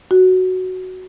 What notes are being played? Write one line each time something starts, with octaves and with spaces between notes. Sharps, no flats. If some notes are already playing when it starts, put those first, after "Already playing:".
F#4